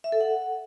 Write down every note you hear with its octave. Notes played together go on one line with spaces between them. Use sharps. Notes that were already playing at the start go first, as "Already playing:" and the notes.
E5
A4
F#5